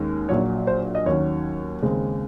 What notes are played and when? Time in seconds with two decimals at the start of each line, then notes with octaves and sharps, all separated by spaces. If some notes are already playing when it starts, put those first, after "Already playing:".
Already playing: D#2 D#3 G#3 C#4
0.29 A#1 A#2 F#3 C#5
0.67 C5
0.95 D#5
1.06 D#2 D#3 F#3 C#4 C#5
1.82 D#2 C#3 G#3 C4